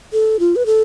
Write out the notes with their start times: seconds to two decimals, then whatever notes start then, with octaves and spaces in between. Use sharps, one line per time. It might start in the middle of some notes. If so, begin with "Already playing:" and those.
0.13 A4
0.40 F4
0.56 B4
0.66 A4